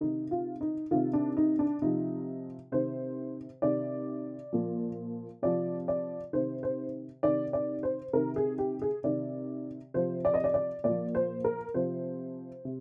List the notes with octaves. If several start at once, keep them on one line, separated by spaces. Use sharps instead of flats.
C3 D#3 D#4
F4
D#4
C3 D#3 F4
D4
D#4
D4
C3 F3 D#4
C3 D#3 C5
C3 D#3 D5
A#2 F3
C3 F3 D5
D5
C3 D#3 C5
C5
C3 D#3 D5
D5
C5
C3 D#3 A#4
G#4
G4
G#4
C3 D#3 D5
C3 F3 C5
D5
D#5
D5
D5
A#2 F3 D5
C5
A#4
C3 F3 C5
C3